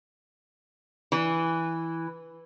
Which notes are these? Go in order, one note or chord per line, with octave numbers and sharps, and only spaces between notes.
E3